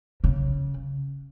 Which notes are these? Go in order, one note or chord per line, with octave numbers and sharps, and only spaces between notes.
C#3